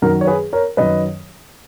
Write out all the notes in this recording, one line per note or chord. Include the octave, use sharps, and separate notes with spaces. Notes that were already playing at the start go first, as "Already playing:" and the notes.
F#2 D#3 F#3 A#4
C#5
G#4 B4
A#4 C#5
F#2 D#3 F#3 B4 D#5